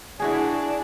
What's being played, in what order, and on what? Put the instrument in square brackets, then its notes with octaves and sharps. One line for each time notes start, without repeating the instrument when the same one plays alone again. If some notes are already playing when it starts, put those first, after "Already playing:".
[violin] D4 [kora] E4 F#4 G#4